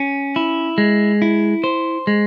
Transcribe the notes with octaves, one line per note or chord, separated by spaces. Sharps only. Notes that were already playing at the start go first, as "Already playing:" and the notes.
Already playing: C#4
E4
G#3
E4
C5
G#3